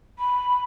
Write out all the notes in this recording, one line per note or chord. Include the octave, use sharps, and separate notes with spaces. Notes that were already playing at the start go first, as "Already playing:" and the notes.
B5